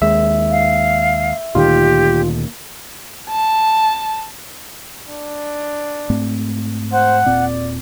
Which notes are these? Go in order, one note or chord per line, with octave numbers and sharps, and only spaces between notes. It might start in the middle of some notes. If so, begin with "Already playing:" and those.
D#2 G#3 E5
F5
D2 A#2 D#3 F4 G4
A5
D4
G#2 A3 C4
C5 F#5
D#1 A#2 C4 D5